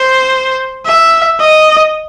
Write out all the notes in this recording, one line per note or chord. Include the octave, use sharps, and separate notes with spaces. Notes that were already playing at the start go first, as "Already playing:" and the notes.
Already playing: C5
E5
D#5